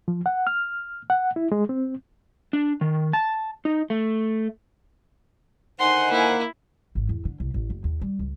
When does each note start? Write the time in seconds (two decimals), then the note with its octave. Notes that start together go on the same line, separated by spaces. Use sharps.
0.08 F3
0.26 F#5
0.47 F6
1.10 F#5
1.36 E4
1.52 G#3
1.69 C4
2.53 D4
2.81 D#3
3.13 A5
3.65 D#4
3.90 A3
5.79 D3 D#3 D#4 C5 F#5 G#5 C6
6.11 A#3 E4
6.95 G#1
7.09 E2
7.25 D3
7.40 C2
7.54 A1
7.70 F#1
7.84 D#2
8.01 G3
8.19 C#2